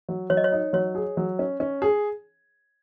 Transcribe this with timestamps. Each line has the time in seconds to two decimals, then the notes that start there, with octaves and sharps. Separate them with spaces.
0.09 F#3
0.30 F#3 C#5
0.37 D#5
0.44 C#5
0.52 D#4
0.73 F#3 C#5
0.95 G#4
1.17 F#3
1.39 C#4
1.60 C#4
1.82 G#4